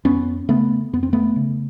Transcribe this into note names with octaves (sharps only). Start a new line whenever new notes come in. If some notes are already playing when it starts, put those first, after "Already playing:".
F2 B3 C#4
C#3 A3 B3
F2 B3
C4
A3 B3
C#3